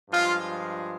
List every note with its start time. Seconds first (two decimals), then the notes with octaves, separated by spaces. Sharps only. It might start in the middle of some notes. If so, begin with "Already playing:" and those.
0.10 G2 F3 G#3 F4